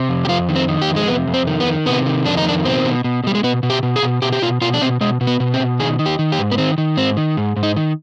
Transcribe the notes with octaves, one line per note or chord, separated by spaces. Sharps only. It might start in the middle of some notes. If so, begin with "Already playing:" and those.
Already playing: C3
F2
G4
F2 F4
D#3
C4
D#3
G4
F2
G#3
C3 B3
F2
C4
D#3
B3
D#3
C3 B3
D#3
F2 D4
D#4
D#3 D4
B2 C4
B2
B2
B2 G3
G#3
B2 B3
B2
G4
B2
G#4
B2
B2 G4
G4
B2 F4
B2 F4
D4
B2 C4
B2 G#3
B2
B3
B2
C4
B2
D#3 G#4
D#3
G4
D#3
G4
G#2
B3
D#3 C4
D#3
G#2 C4
D#3
G#2
G#2
D#4
D#3